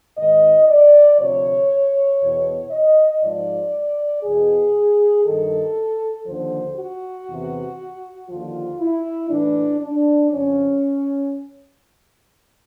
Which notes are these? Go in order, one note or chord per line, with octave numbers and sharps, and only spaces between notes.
G#2 D#3 D#5
D5
D2 C3 F3 C#5
E2 B2
D#5
G#2 F3 D5
E2 B2 G#4
G2 D#3 A4
D#2 D3 F3 C5
F#4
E2 C3 E3
D#2 D3 F3 F4
E4
A2 E3 D4
D4
F2 C#3 F3 C#4